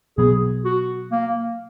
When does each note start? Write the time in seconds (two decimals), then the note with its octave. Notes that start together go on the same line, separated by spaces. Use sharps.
0.18 B2 F#3 B3 G#4
0.65 F#4
1.12 A#3